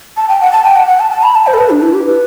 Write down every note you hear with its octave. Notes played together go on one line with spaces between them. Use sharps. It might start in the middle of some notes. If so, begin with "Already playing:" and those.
A5
G5
F#5
A5
G5
F#5
F#5
A5
A5
B5
A5
C5
A4
B4
D4
E4
G4
B4